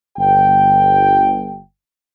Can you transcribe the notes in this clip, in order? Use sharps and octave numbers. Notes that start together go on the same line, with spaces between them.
G1 G5